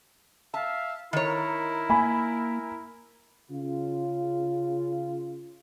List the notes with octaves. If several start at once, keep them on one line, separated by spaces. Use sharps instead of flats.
E5 F5 A5
D#3 E4 A#4 C#5
A#3 G#5 B5
C#3 F4